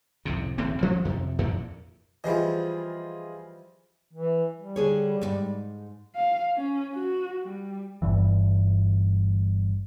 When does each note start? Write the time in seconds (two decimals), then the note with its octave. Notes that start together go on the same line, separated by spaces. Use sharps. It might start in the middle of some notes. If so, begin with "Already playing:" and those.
0.25 C2 F2 A2 C3
0.58 D1 A2 E3 C4
0.80 D2 F3 C#4
1.05 F2 C3
1.38 F2 A#2 D3 E3
2.24 E3 F3 G3 F4 G#4 D#5
4.13 E3
4.56 G3
4.76 D3 G#4 C#5
5.21 F2 G#2
6.16 F5
6.56 C#4
6.94 F#4
7.43 G3
8.02 G1 G2 E3